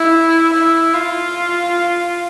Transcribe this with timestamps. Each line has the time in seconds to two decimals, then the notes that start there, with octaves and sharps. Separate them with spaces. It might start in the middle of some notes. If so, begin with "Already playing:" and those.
Already playing: E4
0.53 E4
0.94 F4